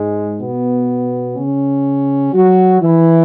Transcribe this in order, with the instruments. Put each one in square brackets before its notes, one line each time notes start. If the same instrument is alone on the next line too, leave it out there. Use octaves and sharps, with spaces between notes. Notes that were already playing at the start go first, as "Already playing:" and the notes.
Already playing: [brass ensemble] G#2 G#3
B2 B3
C#3 C#4
F#3 F#4
E3 E4